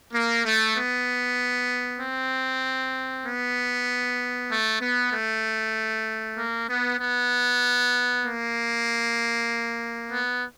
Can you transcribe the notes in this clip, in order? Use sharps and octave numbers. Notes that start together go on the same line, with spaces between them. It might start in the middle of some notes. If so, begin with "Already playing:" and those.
A#3
A3
B3
C4
B3
A3
B3
A3
A#3
B3
B3
A#3
B3